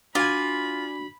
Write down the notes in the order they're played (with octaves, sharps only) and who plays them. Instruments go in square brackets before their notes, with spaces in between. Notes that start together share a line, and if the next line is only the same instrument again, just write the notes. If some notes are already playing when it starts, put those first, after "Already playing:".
[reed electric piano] D4 F#4 [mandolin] F4 [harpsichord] D5 G#5 [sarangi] B5